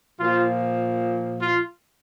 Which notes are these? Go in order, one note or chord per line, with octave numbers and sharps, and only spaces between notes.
A#2 F3 F4
F4